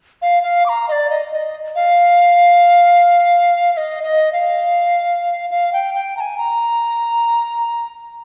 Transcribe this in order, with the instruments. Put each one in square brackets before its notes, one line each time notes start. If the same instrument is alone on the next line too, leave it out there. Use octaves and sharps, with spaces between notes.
[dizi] F5
F5
D6
A#5
D#5
D5
D#5
D#5
F5
F5
D#5
D#5
F5
F5
G5
G5
A#5
G#5
A#5